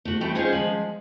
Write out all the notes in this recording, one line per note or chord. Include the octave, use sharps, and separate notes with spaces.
A3 F#4
E3 G3 A3 C4
C#4 D#4 F4 G#4 C5 C#5
F3 G#3